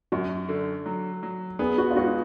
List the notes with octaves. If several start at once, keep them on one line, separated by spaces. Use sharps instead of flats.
F#2 F#4
D3
F#3
F#3
B3 G#4
F#4
F4
G#2 F#4